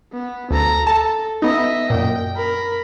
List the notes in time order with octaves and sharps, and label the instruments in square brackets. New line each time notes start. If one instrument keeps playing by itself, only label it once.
[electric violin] B3
[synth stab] D2 [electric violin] A4 A#5
[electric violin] A4 [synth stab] A5
[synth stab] B3 D#4 [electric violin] D#5 E5
[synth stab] F#2 A#2 [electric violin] G5
[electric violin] A#4 B5